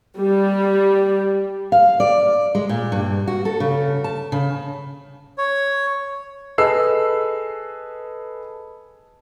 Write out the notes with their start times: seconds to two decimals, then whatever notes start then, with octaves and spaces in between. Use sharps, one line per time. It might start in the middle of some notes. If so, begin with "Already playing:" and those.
0.17 G3
1.72 F5
2.00 D5
2.55 G#3
2.69 A#2
2.92 G2
3.28 F#4
3.45 A4
3.60 C#3
4.04 A5
4.32 C#3
5.38 C#5
6.58 G#4 A4 B4 D#5 E6 C7